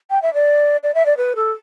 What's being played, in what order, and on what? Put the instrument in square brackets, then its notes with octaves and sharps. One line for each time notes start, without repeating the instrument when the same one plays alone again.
[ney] G5
E5
D5
D5
E5
D5
B4
A4